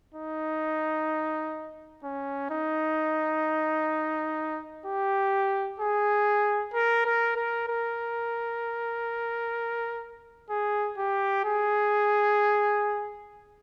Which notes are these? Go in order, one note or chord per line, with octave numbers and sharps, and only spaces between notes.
D#4
C#4
D#4
G4
G#4
A#4
A#4
A#4
A#4
G#4
G4
G#4